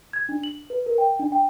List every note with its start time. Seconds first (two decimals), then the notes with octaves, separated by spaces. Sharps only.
0.13 G#6
0.29 D4
0.43 F#7
0.70 B4
0.86 A#4
0.98 G5
1.19 D4
1.32 G5